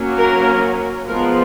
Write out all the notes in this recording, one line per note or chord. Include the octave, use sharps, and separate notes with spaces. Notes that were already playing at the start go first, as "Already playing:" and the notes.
Already playing: F#3 A#3 C#4
A#4
F3 G#3 B3 A#4